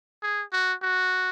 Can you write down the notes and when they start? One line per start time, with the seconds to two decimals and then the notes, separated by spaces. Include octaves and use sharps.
0.23 G#4
0.53 F#4
0.82 F#4